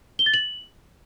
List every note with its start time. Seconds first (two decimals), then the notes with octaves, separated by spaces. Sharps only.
0.19 G7
0.26 A6
0.34 F#7